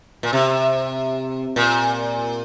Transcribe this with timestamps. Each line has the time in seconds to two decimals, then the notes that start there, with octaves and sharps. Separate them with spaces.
0.23 A#2
0.33 C3
1.56 A#2